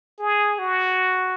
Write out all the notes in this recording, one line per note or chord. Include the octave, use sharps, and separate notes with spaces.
G#4
F#4